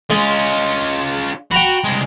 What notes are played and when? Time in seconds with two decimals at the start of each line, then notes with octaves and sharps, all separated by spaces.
0.10 G#3 C#4 F4
1.51 F#4 G5 A#5 B5
1.84 C2 G#3